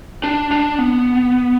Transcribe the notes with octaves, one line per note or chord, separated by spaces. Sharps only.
D4
D4
B3